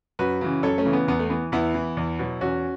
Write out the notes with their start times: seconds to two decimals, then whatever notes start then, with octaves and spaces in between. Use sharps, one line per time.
0.19 F#2 F#4 B4
0.41 C#3 E3
0.63 F#2 A4 C#5
0.78 A3 C#4
0.85 C#3 E3
0.93 B3
1.08 E2 B3
1.19 A3
1.30 E3 B3
1.52 E2 B3 E4
1.75 E3
1.97 E2
2.19 B2 F#3
2.41 E2 C#4 F#4